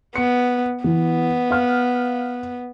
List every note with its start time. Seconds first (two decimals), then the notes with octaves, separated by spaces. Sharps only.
0.16 B3 C#7
0.84 E3 B3
1.50 F5 F6